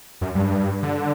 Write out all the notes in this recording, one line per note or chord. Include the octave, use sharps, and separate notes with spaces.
F#2
G2
D3